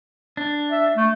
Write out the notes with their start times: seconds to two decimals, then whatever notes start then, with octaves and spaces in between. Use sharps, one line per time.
0.37 D4
0.71 E5
0.96 A3